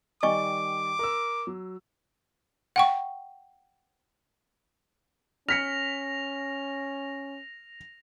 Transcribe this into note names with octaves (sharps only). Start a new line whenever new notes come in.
D#3 G3 D5 D#5 G#5 C#6 D6
A#4 E6
F#3
F#5 G5 C#6
C#4 F6 A#6 B6 C#7 F7